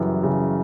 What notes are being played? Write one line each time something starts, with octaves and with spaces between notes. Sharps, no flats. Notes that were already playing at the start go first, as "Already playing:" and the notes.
Already playing: F#2 C#3 E3 G3
C#3